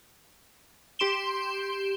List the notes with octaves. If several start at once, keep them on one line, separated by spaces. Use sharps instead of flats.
G4 C6 D7 E7 G7